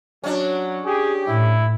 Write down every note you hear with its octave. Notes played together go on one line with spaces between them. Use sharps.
F#3 C#4 D4
G4 G#4
A2 E4